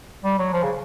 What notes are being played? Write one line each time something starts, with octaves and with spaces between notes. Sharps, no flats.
G3
F#3
F3
C#3